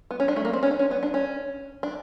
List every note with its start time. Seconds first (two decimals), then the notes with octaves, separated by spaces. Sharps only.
0.11 B3
0.20 C#4
0.28 D4
0.36 A3
0.45 A#3
0.53 C4
0.63 C#4
0.71 D4
0.79 C#4
0.91 B3
1.03 D4
1.14 C#4
1.83 D4